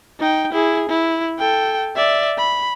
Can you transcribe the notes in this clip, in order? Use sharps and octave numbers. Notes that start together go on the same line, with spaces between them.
D#4 G5
E4 G#4
E4
A4 G5
D5 E5
B5